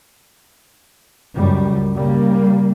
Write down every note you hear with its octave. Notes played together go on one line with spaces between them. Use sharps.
C#2 F#2 G3
C#3 G3 A#3